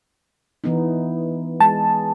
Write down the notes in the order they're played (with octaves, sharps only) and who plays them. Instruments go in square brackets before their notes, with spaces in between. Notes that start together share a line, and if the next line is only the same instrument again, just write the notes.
[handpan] E3 B3 D#4
[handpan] G#3 [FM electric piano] A5